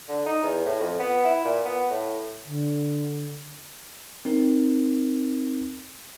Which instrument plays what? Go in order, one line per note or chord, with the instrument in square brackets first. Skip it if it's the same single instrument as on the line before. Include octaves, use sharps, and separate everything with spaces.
[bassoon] D3
D#4
E2
A2
F2
B3
E4
A#2
B3
A2
[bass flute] D3
[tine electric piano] C4 D#4 A#4